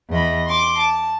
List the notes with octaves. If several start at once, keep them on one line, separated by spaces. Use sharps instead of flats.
E2 D#5 B5
C6 D6
A5